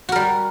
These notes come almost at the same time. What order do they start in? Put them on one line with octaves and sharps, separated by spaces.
F#4 A#4 G3